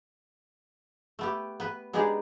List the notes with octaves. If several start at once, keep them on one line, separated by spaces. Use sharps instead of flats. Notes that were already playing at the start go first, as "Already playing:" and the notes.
A3 B3 G4
B3 B4
G#3 B3 D4 D#4 G4 G#4